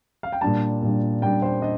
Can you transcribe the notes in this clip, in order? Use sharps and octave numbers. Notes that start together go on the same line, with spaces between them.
F5
G5
A#2 G3 D4 A5
A#2 G3 D4
A#2 G3 D4 G5
C5
D4 D#5